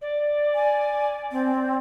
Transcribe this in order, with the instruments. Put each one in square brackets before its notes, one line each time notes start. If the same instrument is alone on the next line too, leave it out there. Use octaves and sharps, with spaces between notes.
[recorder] D5
[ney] G#5
C4